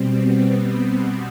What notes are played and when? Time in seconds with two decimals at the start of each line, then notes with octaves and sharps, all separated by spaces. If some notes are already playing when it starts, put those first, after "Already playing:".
Already playing: B2 G3 C4
0.17 B3
0.47 C4